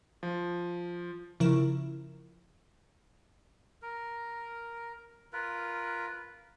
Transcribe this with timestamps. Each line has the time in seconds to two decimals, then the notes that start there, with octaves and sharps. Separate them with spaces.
0.23 F3
1.40 C#3 F3 E4 A#4
3.82 A#4
5.33 F4 A#4 B4